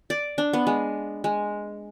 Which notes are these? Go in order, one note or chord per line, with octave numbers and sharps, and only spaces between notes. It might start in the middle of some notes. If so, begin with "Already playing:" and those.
D5
D4
B3
G#3
G#3